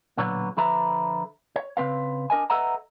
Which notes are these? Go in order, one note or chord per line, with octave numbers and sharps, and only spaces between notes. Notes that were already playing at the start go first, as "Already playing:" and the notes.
B1 A#2 D3 F#3 B3 C#5
D3 F3 A4 B4 E5 A#5
C#5
C#3 C4 B4 F5
D4 A#4 D#5 G#5
A4 B4 D#5 E5 F#5 A#5